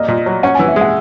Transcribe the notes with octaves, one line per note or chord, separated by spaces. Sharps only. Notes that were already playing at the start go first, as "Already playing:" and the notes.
Already playing: A#3 D5 D#5
A#2
F#3
C#4 F#5
E3 G#5
E5
G#3 F#5